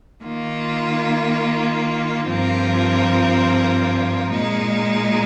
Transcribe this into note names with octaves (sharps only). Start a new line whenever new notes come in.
D#3 A#3 F4
G2 F3 C4 F4 A#4
A#2 G#3 D#4